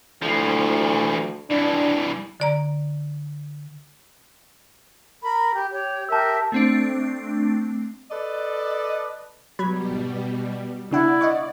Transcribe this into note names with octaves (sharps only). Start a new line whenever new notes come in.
D2 E3 F3
G2 E3 D4
D3 D5 A#5
A#4 B5
G4
G4 C#5
G4 A#4 E5 A5 E6
A3 C4 D4
A4 B4 D5 D#5
B2 F#3 G3 B5 G#6
G#1
C#3 D4 E4 D5 F#5
D#5 F#5 C#6